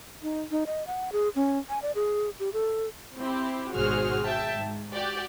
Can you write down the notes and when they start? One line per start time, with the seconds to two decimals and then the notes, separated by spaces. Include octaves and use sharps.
0.22 D#4
0.51 D#4
0.66 D#5
0.87 F#5
1.12 G#4
1.35 C#4
1.69 G#5
1.82 D5
1.95 G#4
2.40 G4
2.53 A4
3.17 C4 E4 G4
3.73 G#1 B2 F#4 G#4 C5 F6
4.24 E5 G5 A5
4.55 G#2
4.94 F#4 G4 D5